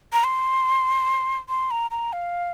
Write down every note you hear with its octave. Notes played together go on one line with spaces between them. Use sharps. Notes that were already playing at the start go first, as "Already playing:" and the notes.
A#5
C6
C6
A#5
A#5
F5